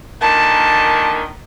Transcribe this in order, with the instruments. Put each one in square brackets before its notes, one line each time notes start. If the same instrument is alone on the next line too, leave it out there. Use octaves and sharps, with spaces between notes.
[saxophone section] A#2 D3 D#3 [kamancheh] A5